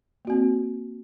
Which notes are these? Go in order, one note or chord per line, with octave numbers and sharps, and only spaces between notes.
A#3 C4 F#4